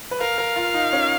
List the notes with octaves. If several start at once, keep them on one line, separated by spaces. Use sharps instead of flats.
B4
A#4 F5
A#4
F4
D#4
C#4